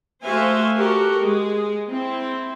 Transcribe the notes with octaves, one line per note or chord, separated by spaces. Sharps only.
A3 F#4 C5 E5 F5 G#5
F#4 G4 A4 A#4
G#3 G#4
C4 E4